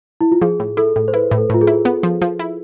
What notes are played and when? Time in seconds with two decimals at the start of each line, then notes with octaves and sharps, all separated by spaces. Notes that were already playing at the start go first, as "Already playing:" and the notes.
0.21 E4
0.32 F4
0.42 F3 G#4
0.60 A2
0.77 E4 A4
0.96 A2
1.08 C5
1.13 E4 B4
1.31 A2
1.38 A4
1.50 A2 F4
1.61 G#4
1.67 E4
1.85 B3
2.03 F3
2.22 F3
2.39 E4